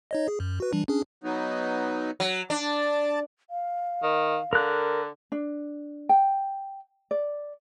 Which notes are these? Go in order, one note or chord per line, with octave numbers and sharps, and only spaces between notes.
D#4 C#5 D#5
G#4
F#2
F#4 B4
E3 G3 D4
C#4 D4 G#4
F#3 B3 D#4
F#3
D4 D5 A5
F5
D#3
D3 A#4 F#6
D4
G5
D5